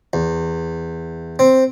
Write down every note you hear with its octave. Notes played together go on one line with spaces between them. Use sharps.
E2
C4